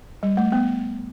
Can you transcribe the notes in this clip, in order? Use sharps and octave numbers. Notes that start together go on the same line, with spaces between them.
G3
A3
B3